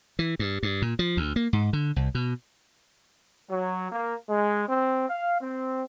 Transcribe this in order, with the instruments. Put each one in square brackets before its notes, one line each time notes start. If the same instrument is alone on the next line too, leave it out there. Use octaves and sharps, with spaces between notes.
[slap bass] E3
G2
G2
A#2
F3
D2
A#3
G#2
D3
C2
B2
[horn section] F#3
A#3
G#3
C4
F5
C4